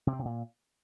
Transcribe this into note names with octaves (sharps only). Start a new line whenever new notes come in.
C3
C4
C3
A#2